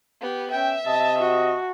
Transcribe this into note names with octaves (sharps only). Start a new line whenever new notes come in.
B3 G4
C#4 E5 G5
C3 D#5 A5
F#4